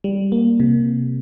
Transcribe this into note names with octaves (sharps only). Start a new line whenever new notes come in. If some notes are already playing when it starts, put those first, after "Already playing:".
G3
A#3
C3